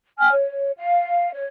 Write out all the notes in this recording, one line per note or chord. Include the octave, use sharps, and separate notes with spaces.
G5 G#5 F6
C#5
F5
C#5